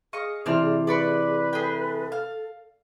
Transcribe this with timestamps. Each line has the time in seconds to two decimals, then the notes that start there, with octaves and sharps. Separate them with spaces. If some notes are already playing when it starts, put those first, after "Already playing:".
0.13 G#4 D#5 F5 C#6
0.46 C3 E3 C4 D4 C6 F6
0.87 B4 D5 B5 C#6
1.53 G#4 A4 G5
2.12 F5